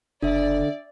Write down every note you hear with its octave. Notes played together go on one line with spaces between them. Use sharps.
F#1 D3 D4 D5 E5